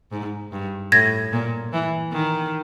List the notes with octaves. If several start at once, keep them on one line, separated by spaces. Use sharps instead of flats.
G#2
G2
A2 G#6 A#6
A#2
E3
D#3